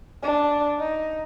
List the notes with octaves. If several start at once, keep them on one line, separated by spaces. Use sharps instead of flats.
D4
D#4